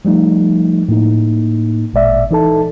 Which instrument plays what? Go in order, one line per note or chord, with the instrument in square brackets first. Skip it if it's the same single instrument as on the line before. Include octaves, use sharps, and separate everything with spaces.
[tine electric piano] F3 G3 A3 D#4
A2 A#3 D#4
G#1 A#2 G#3 D5 E5
E3 D#4 A4 A5